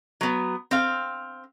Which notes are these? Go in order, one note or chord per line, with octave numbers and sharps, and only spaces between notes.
F#3 B3
C4 F5